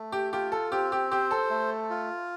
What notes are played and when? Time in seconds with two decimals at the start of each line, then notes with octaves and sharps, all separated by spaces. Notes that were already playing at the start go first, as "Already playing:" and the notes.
Already playing: A3
0.12 G4
0.32 F4 G4
0.52 A4
0.71 C4 G4
0.92 G4
1.11 G4 C5
1.31 A4
1.50 A3
1.90 F4